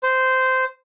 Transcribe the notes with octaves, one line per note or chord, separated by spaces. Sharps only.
C5